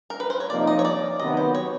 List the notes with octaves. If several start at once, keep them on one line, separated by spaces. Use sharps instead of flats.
A#4
B4
C5
C#5
C3 F3 A#3 D#4 D5
D#5
C#5
D5
C3 D#3 F#3 B3 D#5
C5
C#5